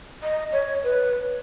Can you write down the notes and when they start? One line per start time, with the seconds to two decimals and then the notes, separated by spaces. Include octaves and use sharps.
0.23 D#5
0.52 C#5
0.83 B4